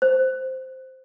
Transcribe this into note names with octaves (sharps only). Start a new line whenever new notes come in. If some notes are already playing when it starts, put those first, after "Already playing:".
C5